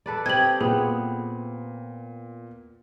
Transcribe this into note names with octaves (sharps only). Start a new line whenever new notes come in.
A4 B4 D5
C4 G4 D#5 G#6 F#7
A#2 B3 G#4